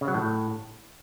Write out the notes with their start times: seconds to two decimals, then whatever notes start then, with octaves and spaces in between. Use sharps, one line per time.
0.01 C#3
0.08 F#3
0.14 A2